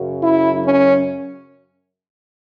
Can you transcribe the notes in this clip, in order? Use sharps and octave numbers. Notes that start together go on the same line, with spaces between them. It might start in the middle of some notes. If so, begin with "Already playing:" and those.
Already playing: F#2 C#3 F#3
E4
C#4